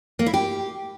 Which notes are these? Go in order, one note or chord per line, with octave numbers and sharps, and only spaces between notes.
A#3
E4
G4